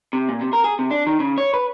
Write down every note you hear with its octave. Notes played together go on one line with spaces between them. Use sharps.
C3
A#2
C3
A#4
G#4
C3
D4
D#3
C#3
C#5
B4